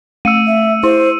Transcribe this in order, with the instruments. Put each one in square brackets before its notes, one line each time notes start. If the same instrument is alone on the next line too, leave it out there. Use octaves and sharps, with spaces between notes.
[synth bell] A3 [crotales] E6 C#7 D#7
[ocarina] E5
[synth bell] E4 [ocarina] C5